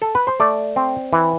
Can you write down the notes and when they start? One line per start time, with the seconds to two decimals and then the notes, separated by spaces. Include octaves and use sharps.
0.02 A4
0.15 B4
0.27 C5
0.40 A3 D5
0.76 C4
1.13 E3